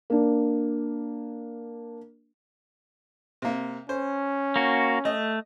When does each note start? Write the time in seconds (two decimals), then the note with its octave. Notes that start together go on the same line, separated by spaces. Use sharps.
0.10 A#3 D4
3.42 C3 A#3
3.89 C#4 C5
4.56 A#3 F#4
5.05 A3 D#5